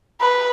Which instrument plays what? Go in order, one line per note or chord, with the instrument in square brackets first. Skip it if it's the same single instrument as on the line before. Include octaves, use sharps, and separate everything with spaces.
[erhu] B4